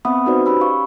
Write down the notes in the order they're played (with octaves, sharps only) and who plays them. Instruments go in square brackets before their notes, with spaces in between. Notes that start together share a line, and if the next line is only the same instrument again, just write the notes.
[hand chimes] B3 C4 E5 F#5 B5 D#6
D#4 F#4 B4 C5 D5
C#4 G4 B5 E6
F5 C#6